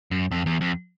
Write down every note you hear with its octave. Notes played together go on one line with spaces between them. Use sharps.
F#2
F2
E2
F2